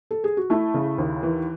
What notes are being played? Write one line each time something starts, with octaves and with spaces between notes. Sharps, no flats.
A4
G#4
F#4
A3 E4
C#3
D#2
E3